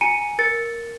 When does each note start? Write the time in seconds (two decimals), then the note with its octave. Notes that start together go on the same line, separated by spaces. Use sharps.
0.01 G#5 A#5 C#7 D#7
0.39 A#4 A6 C#7